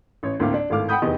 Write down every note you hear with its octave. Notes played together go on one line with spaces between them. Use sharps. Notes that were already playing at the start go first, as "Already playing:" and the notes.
A1 C#5
D2 A2 A#3 C4 F5 D6
D4
G#1 A2 A3 F5 D6 F6
F#5 G5 B5 D#6 G6
F1 E2 D#3 B3 G4 D#5